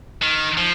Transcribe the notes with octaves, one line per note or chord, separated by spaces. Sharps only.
D#3
F3